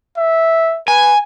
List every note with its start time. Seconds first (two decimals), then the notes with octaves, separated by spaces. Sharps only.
0.17 E5
0.88 B4 G#5